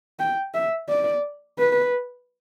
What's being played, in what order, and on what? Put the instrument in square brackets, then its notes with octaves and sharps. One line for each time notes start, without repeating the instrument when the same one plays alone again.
[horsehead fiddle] G5
E5
D5
B4